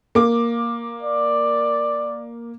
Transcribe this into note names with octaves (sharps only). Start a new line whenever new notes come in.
A#3 D6
D5